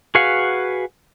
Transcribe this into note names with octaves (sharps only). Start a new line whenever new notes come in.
F#4 G#4 B4 F5 F#5